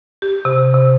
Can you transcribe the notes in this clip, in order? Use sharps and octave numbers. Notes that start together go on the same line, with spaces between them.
G4
C3
C3